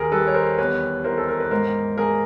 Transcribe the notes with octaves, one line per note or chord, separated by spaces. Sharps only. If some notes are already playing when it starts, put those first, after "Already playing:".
Already playing: D#2 G#4 A#4
G3 A4 B4
C#5
A#4 C5
E2 B4 C#5
E3 A#4 C5
A4
A#4
B4
G#2 A#4 C5
A#3 G#4 A#4